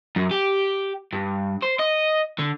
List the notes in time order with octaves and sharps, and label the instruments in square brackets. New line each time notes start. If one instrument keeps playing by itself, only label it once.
[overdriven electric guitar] F#2
G4
G2
C5
D#5
D3